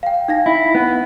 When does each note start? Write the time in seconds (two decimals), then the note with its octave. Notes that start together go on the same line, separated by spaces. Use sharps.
0.03 F5 G5
0.28 D#4 F5 A#6
0.46 E4
0.75 B3